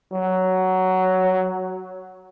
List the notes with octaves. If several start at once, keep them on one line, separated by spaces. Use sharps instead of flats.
F#3